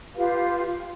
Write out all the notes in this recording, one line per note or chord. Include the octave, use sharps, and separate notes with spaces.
F4 G4 B4 F5